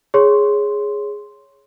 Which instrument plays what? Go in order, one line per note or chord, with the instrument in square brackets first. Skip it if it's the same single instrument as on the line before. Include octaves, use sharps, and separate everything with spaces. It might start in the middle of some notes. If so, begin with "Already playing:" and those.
[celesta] G#4 C#5 C6